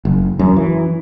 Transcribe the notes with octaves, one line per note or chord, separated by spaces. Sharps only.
F#1
F#2
E3